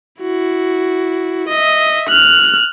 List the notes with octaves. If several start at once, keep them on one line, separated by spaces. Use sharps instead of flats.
E4 F#4
D#5 E5
F6 F#6